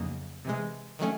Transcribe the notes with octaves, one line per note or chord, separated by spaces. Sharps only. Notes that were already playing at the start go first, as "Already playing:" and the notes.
Already playing: F2 C#3 F#3 A#3 D#4
C3 E3 G#3
D#3 F#3 A3 C#4